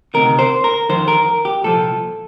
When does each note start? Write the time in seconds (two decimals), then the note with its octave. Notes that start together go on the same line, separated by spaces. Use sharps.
0.14 D2 C3 D#3 A#4
0.39 C5
0.64 A#4
0.89 F2 D#3 C5
1.08 A#4
1.45 G4
1.63 C2 A#2 F3 A4